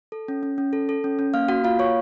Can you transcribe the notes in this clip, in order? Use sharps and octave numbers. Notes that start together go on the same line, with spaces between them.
A4
C#4
C#4
C#4
A4
A4
C#4
C#4
A#3 F5 F6
A#3 F#4 F#5
A#3 F4 F5
A#3 C#5 C#6